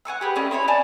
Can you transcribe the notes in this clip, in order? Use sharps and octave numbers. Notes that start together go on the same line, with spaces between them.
F#5 G#5 C#6 E6
G4 G#4 B4
A3 C#4 D5 D#5
C4 E4 C#5 B5
D5 G#5 A5